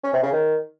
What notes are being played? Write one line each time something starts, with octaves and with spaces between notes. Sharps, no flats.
C#4
C3
C#3
D#3